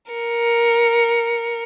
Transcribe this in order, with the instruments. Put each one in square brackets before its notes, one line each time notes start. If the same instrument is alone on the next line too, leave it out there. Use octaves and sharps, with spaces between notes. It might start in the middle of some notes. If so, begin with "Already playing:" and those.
[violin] A#4 C#7